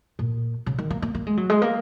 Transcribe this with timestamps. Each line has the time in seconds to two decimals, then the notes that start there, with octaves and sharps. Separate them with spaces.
0.19 A#2
0.66 C#3
0.78 D#3
0.90 A#3
1.02 A#3
1.15 A#3
1.27 G#3
1.37 F#3
1.50 G#3
1.62 A#3